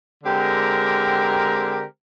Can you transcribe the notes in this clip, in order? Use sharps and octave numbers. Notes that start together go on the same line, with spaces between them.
D3 G#3 C4 G4 A#4